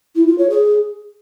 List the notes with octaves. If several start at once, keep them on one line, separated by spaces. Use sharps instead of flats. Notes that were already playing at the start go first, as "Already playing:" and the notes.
E4
F4
C#5
G#4